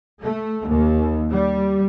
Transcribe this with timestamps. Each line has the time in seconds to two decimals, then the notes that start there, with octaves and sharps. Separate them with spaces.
0.22 A3
0.67 D#2
1.29 G3